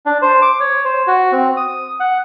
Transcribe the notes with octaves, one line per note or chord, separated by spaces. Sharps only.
D4
C5
D6
C#5
C5
F#4
C4
D#6
F#5